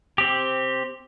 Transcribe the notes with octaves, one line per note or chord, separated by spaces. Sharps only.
C4 G4